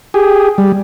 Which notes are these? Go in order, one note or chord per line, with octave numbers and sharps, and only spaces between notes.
G4 G#4
G3